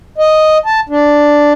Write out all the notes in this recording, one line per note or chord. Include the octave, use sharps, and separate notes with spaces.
D#5
A5
D4